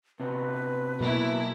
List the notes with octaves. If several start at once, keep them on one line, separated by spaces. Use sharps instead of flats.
C3 B3 B4
B2 F#3 A#3 E4